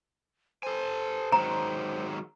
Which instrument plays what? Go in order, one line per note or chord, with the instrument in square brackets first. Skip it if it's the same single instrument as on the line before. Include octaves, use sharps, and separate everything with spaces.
[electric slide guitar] A4 G#5 [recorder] C5
[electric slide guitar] D#3 F#3 G#3 [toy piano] A#5